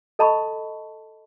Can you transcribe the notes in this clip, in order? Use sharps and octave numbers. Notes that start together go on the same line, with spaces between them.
A4 D#5 A5 B5 C#6